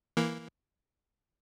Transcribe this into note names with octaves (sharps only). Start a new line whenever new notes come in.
E3 A#3